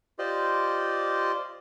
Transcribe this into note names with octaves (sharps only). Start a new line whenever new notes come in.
F4 G4 C5 D5 D#5